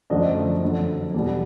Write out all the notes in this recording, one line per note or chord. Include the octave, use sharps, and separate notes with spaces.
F#2 D3 F3 A3 D4 D#5
F2 D3 F#3
E2 B2 G3